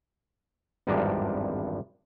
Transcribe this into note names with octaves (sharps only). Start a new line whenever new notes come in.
G#1 E2 G2 F3 D4 A#4